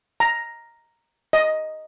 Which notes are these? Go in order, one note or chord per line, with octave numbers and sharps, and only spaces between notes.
A#5
D#5